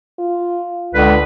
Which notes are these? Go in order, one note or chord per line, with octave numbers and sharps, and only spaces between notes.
F4
C#2 D3 B4